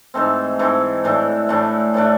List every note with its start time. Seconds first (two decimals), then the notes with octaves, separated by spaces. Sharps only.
0.14 G#2 E3 A3 C4
0.59 G#2 E3 A3 C4
1.04 A2 E3 A3 D4
1.49 A2 E3 A3 D4
1.94 A2 E3 A3 D4